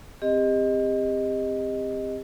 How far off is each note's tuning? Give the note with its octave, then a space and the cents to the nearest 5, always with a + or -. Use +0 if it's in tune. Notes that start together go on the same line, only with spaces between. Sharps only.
C4 +0 G4 +35 D#5 +0